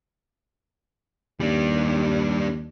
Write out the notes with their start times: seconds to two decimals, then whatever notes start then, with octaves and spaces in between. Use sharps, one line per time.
1.40 D#2 G3 D4